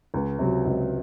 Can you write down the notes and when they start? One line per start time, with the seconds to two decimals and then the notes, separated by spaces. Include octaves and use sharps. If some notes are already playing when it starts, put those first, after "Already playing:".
0.14 C#2
0.39 C3 F#3
0.66 C#2